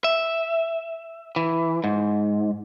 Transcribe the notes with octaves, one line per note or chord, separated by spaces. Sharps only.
E5
E3
G#2